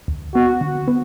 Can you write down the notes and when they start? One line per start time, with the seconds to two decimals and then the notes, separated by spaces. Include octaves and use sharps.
0.08 D2
0.34 B3 F#4
0.61 D3
0.88 B3